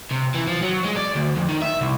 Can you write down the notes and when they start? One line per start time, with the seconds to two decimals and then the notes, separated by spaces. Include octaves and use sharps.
0.11 C3
0.35 E3
0.48 F3
0.63 F#3
0.84 G#3
0.96 D5
1.15 D2
1.36 F2
1.48 D#3
1.62 E5
1.81 C2